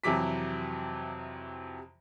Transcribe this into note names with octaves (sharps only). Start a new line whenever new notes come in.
F2 C3 E3 F#3 D6 B6